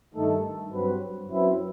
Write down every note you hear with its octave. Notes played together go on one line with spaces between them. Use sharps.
G2 D#3 A3 D#4 A4
G2 F#3 C4 F#4 B4
F#2 F#3 C4 E4 B4